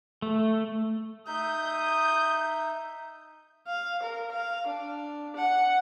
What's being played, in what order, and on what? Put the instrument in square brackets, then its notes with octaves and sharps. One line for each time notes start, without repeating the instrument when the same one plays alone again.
[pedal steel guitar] A3
[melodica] D#4 E5 [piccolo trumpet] D#6 [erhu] G6
[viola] F5
A#4
F5
D4
F#5